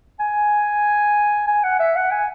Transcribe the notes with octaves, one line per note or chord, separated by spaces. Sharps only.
G#5
G#5
F#5
E5
F#5
G#5